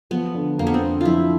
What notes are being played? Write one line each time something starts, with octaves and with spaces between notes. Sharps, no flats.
F3 B3
D3
F2 A#3
B3
C4
D3
F3 E4 F4